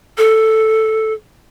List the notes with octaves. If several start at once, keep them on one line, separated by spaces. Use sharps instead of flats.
A4